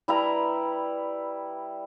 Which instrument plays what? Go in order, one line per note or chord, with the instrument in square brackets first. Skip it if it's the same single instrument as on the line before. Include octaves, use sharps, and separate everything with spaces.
[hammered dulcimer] G3 E4 B4 A#5